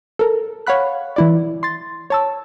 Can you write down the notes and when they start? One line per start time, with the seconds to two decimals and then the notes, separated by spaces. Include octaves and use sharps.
0.19 A4 A#4
0.67 C#5 F5 F#5 B5 F#6
1.16 E3 E4 D5
1.63 C6 A6
2.10 C#5 A5 E6